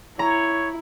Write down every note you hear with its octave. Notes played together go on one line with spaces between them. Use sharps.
E4 C#5 A#5